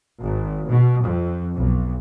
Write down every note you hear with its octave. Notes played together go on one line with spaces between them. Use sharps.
G#1
B2
F2
B1